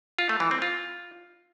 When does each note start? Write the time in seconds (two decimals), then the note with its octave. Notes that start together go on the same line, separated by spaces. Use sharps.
0.19 F4
0.29 A3
0.40 E3
0.51 C4
0.62 F4